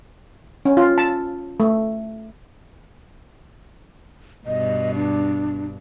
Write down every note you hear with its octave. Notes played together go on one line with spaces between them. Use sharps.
C#4
F4
A5
A3
G2 B2 D#5
D4